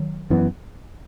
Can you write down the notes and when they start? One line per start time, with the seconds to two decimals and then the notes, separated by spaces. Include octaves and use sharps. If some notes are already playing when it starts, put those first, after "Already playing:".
Already playing: D#3 F#3
0.30 F#2 E3 B3